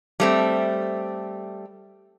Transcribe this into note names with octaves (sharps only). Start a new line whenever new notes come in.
G3 A3 C4